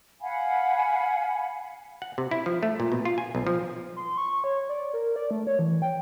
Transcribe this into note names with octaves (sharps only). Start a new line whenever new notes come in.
F5 F#5 G#5 B5
F#5
C3
E4
F3
A3
A#2
B2
F4
G#5
B1
F3
C6
C#6
C#5
D5
A#4
D5
A3
C#5
E3
G5